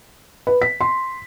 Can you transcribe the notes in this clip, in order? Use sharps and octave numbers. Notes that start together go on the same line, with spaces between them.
B4
B6
C6